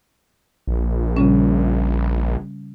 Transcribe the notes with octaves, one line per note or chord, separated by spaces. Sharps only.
A#1
C#3 G3 C#4